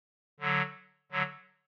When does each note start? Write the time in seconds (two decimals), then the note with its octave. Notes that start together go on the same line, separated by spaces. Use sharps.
0.40 D3 F#3
1.12 D3 F#3